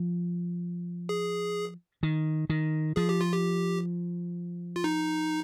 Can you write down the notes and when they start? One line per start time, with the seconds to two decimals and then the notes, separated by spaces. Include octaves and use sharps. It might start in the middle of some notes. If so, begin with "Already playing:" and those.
Already playing: F3
1.09 G#4
2.03 D#3
2.50 D#3
2.96 F3 G#4
3.09 G4
3.21 F4
3.33 G4
4.76 F4
4.84 D#4